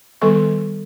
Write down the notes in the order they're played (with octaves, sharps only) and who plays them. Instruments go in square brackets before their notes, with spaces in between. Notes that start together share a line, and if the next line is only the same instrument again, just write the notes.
[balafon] D#3 G3 B3 A4 C#6